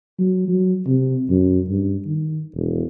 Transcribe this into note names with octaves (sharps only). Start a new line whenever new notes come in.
F#3
F#3
C3
F#2
G2
D#3
E1